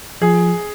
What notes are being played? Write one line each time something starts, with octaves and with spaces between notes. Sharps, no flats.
F3 G#4